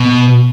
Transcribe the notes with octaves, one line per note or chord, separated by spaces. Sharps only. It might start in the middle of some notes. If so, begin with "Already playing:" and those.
Already playing: B2